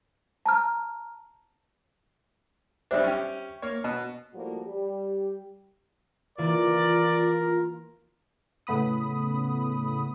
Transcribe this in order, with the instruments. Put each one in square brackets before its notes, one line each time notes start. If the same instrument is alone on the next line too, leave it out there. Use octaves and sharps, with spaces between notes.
[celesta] A5 A#5 F6
[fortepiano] B1 G3 D4 [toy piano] C5 E5
[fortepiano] C#4 G4
A#3 C#5
[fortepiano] B2 [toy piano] A5
[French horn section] A2 F3 G3 A#3 F#4
G3 G4
[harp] E3 A#3 [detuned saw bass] F4 [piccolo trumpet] A#4 [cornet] D5
[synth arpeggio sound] A2 C#3 A3 B3 B5 D#6